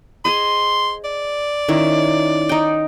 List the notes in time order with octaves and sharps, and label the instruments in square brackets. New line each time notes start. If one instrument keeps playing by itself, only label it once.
[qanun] G#4 C5 D#5 [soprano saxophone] C6
[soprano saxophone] D5
[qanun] D#3 C#4 E4
D#4 G5